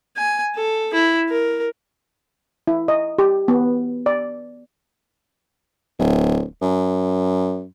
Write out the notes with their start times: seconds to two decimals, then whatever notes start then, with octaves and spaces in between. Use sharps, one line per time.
0.17 G#5
0.56 A4
0.94 E4
1.29 A#4
2.68 E4
2.88 D#5
3.19 G4
3.48 B3
4.06 D5
5.99 D1
6.62 F#2